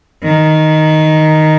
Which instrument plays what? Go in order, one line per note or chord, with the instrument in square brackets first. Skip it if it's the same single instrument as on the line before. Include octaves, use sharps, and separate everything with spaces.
[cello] D#3